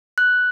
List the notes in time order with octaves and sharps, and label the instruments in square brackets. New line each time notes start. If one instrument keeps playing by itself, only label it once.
[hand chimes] F#6